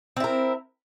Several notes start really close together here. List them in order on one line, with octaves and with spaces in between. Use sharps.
C4 E4 A#4